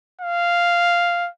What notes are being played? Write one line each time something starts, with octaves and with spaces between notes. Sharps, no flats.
F5